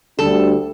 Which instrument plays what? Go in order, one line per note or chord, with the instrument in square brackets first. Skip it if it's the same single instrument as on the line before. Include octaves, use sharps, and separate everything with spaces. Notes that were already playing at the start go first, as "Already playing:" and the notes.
[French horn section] D2 D3 G3 D4 [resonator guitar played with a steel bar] A4